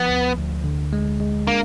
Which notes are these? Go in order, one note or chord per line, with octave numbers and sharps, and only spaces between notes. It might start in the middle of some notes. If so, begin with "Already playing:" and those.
Already playing: F3 B3
D2
D2
D3
G#3
G#3
A#3 D4